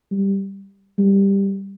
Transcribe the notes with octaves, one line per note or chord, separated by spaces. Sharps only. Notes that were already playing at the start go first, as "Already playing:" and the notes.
G3
G3